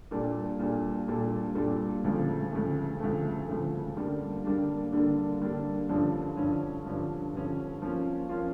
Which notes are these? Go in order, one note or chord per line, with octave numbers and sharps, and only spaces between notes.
A#2 G3 D4 A4
A#2 G3 D4 A4
A#2 G3 D4 A4
A#2 G3 D4 A4
D2 C#3 F3 A3
D2 C#3 F3 A3
D2 C#3 F3 A3
D2 C#3 F3 A3
D3 G3 A#3 D4
D3 G3 A#3 D4
D3 G3 A#3 D4
D3 G3 A#3 D4
G2 D3 F3 C#4
G2 D3 F3 C#4
G2 D3 F3 C#4
G2 D3 F3 C#4
F3 A#3 C#4 F4
F3 A#3 C#4 F4